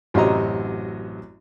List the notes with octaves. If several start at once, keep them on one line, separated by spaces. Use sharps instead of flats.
A1 F#2 C3 F#3 D#5 A#5